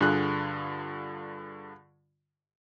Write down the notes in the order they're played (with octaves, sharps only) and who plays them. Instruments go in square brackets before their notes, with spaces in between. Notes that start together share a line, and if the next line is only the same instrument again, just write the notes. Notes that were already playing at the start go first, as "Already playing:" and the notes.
[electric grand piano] G2 D3 F4 G#4 F#6